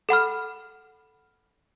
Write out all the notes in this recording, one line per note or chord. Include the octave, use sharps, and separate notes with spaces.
A4 F#5 B5 F6